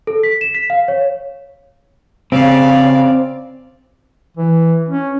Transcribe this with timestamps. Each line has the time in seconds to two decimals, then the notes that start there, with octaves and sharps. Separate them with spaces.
0.07 A4
0.23 B6
0.41 E7
0.55 B6
0.70 F5
0.88 C#5
2.32 C#3 C4 D5 F5
4.37 E3
4.89 C#4